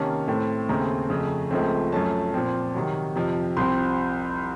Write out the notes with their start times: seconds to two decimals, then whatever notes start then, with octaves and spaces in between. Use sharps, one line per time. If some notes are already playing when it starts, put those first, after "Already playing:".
Already playing: C3 D#3 A#3 C#4 A5
0.28 A2 A3 C4
0.69 D#2 C#3 A3 C4 A#5
1.10 F2 C#3 A3
1.51 C#2 C#3 F3 A3 C4
1.92 F#2 F3 A3 C#4 A5
2.34 A#2 F3 C4
2.75 C3 D#3 F#3
3.15 F2 C3 F3
3.57 C2 C3 F3 C4 C6